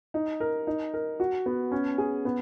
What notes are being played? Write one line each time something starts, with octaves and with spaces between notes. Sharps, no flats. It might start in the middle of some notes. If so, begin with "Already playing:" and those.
D#4
A#4
D#4
A#4
F#4
B3
C#4
G#4
B3